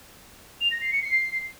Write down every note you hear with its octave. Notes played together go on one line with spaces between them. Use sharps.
F7
A#6
C7
C#7
C7